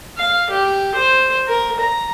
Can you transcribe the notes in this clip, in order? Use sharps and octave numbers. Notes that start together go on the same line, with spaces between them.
F5
G4
C5
A#4
A#5